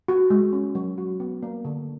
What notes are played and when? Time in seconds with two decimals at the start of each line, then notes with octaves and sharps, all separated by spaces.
0.08 F#4
0.30 G#3
0.53 C#4
0.75 F#3
0.98 F#4
1.20 B3
1.43 A#3
1.65 D3